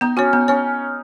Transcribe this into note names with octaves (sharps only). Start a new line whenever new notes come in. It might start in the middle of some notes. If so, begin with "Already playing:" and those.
B3 D#4
C#4 F#4 C#5
B3 D#4
C#4 C#5